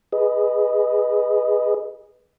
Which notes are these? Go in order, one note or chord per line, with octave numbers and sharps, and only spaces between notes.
G#4 B4 D#5